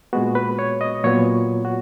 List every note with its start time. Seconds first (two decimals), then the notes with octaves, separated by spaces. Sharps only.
0.13 A#2 G#3 B3 F#4
0.35 B4
0.59 C#5
0.81 D#5
1.04 A#2 F#3 B3 C#5
1.65 F#4